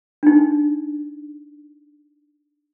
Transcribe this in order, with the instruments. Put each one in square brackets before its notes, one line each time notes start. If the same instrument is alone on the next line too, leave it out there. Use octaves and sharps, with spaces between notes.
[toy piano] D4 D#4